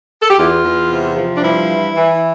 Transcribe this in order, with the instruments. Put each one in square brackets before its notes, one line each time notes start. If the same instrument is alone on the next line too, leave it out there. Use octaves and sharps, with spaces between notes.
[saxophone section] A4
G4
E2 F4
E2
C3
F3
D4
G2 E4
E3
E3